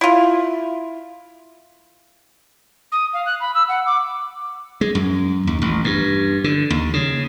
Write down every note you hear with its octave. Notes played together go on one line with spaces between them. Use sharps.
E4 F4
D#6
F5
F#6
B5
E6
F#5
D6
G#3
F#2
D#2
A1
G2
D3
D#2
C#3